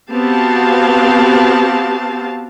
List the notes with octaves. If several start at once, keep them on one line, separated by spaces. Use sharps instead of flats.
B3 C4 F#4 G4 F5 A5